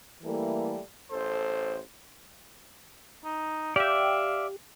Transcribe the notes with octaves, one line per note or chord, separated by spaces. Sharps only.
E3 G3 A3 A#3 A4
A1 A4 C5
D#4
G4 D5 E5 F5